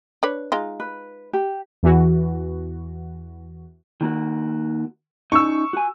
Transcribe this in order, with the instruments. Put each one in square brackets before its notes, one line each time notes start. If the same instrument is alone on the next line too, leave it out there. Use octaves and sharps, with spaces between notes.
[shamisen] D4 B4 C#5
G#3 D#4 F4
[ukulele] B4
G4
[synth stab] E2 E3 F#4
[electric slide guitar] D#3 A#3 F#4
[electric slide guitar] C#4 D#4 [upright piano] C#6 E6
[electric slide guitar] F#4 G#5